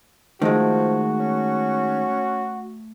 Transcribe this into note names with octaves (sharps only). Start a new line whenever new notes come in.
D#3 F3 G#3 A3 F#4
C#4